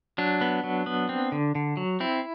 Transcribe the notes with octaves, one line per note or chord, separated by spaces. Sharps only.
F#3 D4
B3
F#3
B3
C4
D3
D3
F#3
C4 E4